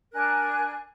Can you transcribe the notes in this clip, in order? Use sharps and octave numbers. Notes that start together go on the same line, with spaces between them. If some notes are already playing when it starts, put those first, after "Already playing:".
D4 A#4 G#5 F#6